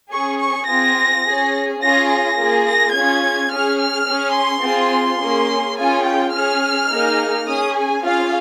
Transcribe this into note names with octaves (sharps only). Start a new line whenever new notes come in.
C#4 G#4 C#6
C#6
C4 F4 G#4 A#6
C#4 G#4
C#4 F4 G#4 A#6
A#6
A#3 F4 G#4
A#6
C#4 F4 G#4 G#6
C#4 G#4 F6
F6
C#4 G#4
C6
C4 F4 G#4
C6
A#3 C#4 G#4
C#4 F4 G#4 G#5
G5
C#4 G#4 F6
A#3 D#4 G#4
C#4 G#4 D#6
G#5
C#4 F4 G#4 F5